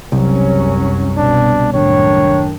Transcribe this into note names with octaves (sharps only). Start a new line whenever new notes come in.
F#1 C2 F#2 F#3 C#4
B2 D4
F#2 A2 D#3 D4 C#5